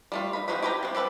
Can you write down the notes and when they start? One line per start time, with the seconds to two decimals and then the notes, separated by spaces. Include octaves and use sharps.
0.12 G3 A3 F4
0.33 D#4 B5
0.48 G#3 C4 D#4 F#4 B5
0.62 E4 G4 B4 G5 A#5
0.83 B3 C4
0.95 G4 A4 B4 A5